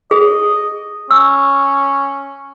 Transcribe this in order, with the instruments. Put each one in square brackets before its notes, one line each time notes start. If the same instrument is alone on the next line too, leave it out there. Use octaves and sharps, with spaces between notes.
[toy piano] G#4 [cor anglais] D#5
[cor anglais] C#4 [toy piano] E6